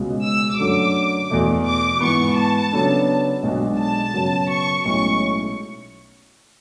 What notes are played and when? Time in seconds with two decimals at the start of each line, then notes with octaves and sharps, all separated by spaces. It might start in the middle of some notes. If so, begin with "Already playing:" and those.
Already playing: C#2 B2 G#3
0.24 E6
0.58 F#2 D3 F#3 A3 D6
1.30 E2 B2 A3
1.65 D6
2.00 G#2 E3 B3 C#6
2.37 A5
2.72 C#3 F#3 B3 D4 A4
3.43 B1 B2 G#3 D4 F#4
3.78 A5
4.14 F#2 C#3 F#3 B3 F#4
4.49 C#6
4.85 B1 A2 G#3 C#4 E4 C#6